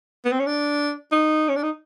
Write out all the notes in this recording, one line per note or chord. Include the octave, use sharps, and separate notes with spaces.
B3
C4
C#4
D4
D#4
C#4
D4
D#4